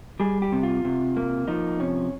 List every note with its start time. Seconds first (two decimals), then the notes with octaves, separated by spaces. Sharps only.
0.20 G3 G#4
0.42 G4
0.52 C3
0.63 F4
0.85 C3
1.17 A#3
1.48 F3 D#4
1.79 C3 C#4